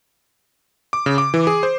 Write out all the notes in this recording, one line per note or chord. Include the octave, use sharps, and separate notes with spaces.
D6
C#3
D6
E3
G#4
C5